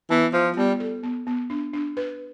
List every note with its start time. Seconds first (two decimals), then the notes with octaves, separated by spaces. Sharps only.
0.10 E3 B3
0.33 F3 F4
0.56 G3 B3
0.80 A4
1.03 B3
1.27 B3
1.50 D4
1.73 D4
1.97 B4